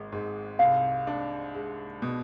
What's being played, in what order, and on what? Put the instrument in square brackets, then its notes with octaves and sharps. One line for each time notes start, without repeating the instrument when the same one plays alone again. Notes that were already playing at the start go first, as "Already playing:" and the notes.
Already playing: [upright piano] G#1 G#3
G#2
[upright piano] C2 [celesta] F5
[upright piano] D4
G#3
B2